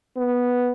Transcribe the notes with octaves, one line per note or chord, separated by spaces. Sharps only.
B3